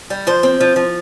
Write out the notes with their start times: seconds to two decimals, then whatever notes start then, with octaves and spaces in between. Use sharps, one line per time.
0.10 G3
0.27 F3 C5
0.43 C4
0.61 F3
0.76 F3